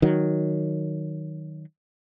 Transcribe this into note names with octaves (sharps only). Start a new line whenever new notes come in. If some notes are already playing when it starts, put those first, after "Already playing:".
D#3 F#3